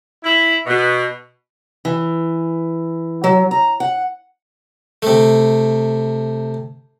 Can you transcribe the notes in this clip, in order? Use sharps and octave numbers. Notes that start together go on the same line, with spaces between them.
E4
B2
E3
F#3
A#5
F#5
C3 A3